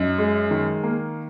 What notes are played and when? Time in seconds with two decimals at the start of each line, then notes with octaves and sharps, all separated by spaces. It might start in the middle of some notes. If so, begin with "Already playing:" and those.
Already playing: F#2 D#4
0.18 G#3
0.51 D#3
0.83 A#3